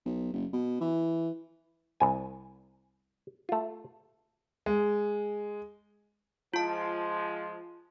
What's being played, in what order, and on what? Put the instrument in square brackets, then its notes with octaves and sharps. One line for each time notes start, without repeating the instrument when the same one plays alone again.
[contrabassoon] B1
F#1
B2
E3
[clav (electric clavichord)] C2 G#5
A3 F4
[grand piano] G#3
[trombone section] F3 G#3 [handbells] F4 A5